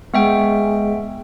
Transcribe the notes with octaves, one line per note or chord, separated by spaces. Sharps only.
G#3 B3 E5 G5